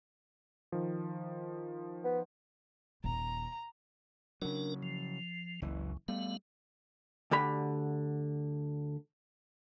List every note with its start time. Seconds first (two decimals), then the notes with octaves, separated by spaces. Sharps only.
0.72 D#3 F3
2.04 B3
3.04 D#1 A#5
4.42 C#3 F#3 D4 A#4
4.83 F3
5.62 F#1 C#2 E3
6.08 G3 A3 B3 F5
7.31 D2 D3 G4 B5